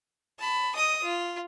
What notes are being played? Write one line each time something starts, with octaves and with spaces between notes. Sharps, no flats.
A5 B5
D#5 D#6
F4